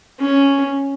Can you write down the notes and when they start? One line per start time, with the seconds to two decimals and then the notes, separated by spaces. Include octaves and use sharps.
0.20 C#4